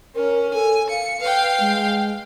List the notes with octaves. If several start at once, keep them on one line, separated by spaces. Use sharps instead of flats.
C#4 A#4
A4 G#5
F5 C#7
B4 F5 G5
G#3